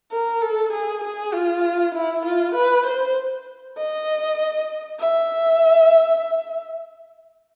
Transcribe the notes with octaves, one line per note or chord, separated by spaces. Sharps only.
A#4
A4
G#4
G#4
F4
E4
F4
B4
C5
D#5
E5